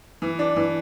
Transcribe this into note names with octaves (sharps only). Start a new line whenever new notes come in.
E3
D4
E3